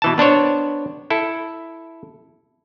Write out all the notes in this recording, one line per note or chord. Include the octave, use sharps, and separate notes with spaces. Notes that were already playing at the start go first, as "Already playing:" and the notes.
B2 E3 A5
B3 D4 C5 C#5
E4 A4